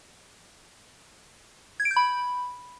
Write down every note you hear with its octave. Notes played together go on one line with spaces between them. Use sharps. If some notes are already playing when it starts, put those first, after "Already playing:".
G#6
D7
G6
B5